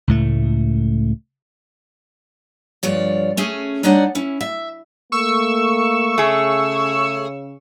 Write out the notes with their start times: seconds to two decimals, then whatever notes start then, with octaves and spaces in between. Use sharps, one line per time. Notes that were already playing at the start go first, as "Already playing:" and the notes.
0.07 C#2 A2 A3
2.83 D2 G2 F3 C#5 D5
3.37 A3 C#4 G#4
3.83 G3 D4 D#4 C#5 D5 F#5
4.15 C#4 E4
4.41 E5
5.12 A3 A#3 C#6 E6
6.18 C#3 A3 G#4